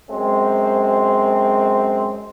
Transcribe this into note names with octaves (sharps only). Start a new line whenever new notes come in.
F#2 G#3 C4 C5